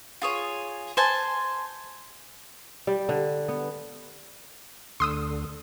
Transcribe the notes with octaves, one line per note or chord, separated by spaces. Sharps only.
F4 G#4 C#5
C5 G#5 A5
G3
D3
B3
D2 D3 C6 D#6 E6